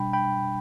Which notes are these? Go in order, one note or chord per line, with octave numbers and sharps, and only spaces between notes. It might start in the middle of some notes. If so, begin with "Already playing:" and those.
Already playing: B2 G3 D4 G5 B5
G5 B5